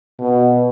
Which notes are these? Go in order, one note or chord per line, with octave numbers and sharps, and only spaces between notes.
B2